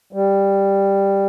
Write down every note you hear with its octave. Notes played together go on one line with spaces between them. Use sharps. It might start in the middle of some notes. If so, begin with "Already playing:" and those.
G3